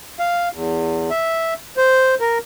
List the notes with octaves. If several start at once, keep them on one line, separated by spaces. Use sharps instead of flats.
F5
E2
E5
C5
A#4